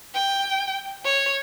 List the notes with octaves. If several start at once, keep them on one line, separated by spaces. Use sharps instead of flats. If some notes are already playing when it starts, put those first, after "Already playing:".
G5
C#5